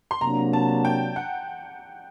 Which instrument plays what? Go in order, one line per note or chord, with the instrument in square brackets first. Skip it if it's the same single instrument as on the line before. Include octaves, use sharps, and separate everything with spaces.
[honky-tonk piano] C6
[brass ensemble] C3 F#3 A#3 D4 [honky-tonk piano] A#5
[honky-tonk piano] A5
G5
F#5